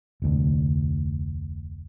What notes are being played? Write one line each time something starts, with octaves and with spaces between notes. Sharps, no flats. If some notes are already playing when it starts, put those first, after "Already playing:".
F1 D2